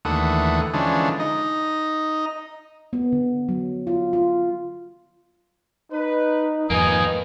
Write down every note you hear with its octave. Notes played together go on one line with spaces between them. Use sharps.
D#2 D3 E3 A3 F#5 D#6
D3 E3 F3 G#3 C#4 D4
D#4 D#5
B3
D3
F#3
F4
F4
D#4 B4
F2 G#2 F3 A#3 D#4 B4 G#5 D#6